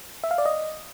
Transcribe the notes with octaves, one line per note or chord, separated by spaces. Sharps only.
E5
F5
D5
D#5